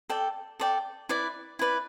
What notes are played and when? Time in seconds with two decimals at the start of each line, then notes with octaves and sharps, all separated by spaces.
0.10 A4 D5 G5
0.60 A4 D5 G5
1.09 E4 B4 D5
1.59 E4 B4 D5